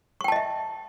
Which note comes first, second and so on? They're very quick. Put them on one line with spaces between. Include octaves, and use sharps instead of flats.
C#6 G5 A5 D#5 E5